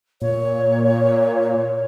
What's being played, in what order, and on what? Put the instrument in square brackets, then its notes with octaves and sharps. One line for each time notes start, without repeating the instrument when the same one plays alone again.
[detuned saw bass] A#2 [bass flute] C#5